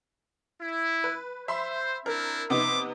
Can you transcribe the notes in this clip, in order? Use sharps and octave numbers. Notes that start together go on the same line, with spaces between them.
E4
B4
C5 E5 B5 C6
C4 D4 E4 A#4
C3 B3 D#4 E5 C6 D6